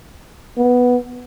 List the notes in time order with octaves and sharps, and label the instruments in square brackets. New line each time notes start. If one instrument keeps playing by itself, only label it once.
[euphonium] B3